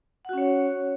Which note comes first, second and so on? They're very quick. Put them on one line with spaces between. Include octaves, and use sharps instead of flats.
F#5 F#4 C#4 C#5